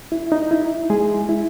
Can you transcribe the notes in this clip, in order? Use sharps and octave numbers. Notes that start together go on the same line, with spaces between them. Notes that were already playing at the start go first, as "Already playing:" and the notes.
E4
D#4
E4
G#3 G#4
E4